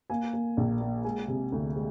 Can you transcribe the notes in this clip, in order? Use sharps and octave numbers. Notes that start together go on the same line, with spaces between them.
A#3 G#5
A#3
A#1
A#3
G#3 G#5
C3
D2
G#3